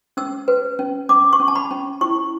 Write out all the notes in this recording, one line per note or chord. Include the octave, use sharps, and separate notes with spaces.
C#4 E6
B4
C#4
C#4 D6
C#6
C#4
A5
B5
C#4
E4 C#6